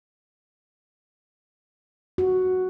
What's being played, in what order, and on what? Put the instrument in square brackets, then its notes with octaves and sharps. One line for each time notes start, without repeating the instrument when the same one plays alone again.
[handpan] F#4